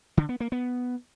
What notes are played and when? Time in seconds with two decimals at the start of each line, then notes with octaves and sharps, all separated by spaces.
0.17 D3
0.29 B3
0.40 A#3
0.52 B3